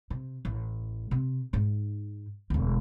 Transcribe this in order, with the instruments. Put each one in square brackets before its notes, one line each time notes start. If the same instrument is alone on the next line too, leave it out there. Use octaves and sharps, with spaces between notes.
[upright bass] C3
A1
C3
G#2 D#4
E1 D2